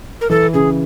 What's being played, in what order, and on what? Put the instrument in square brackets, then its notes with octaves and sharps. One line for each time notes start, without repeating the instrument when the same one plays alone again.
[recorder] A#4
[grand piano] E3 [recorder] A4
[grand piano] C#3 [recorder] G#4